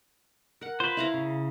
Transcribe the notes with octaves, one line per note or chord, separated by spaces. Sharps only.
A#4 F#5
F4 B4 C5
E4 F5 A#5
C#3